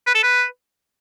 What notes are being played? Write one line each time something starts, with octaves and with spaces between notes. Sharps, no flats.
B4
A4
B4